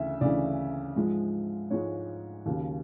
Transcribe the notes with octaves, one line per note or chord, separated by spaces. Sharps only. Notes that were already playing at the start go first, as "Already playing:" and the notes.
Already playing: D2 C#3 E3 E5
D2 C#3 E3 D5
G#2 F3 G#3
G#2 F3 G#3 C#5
D#2 C#3 F#3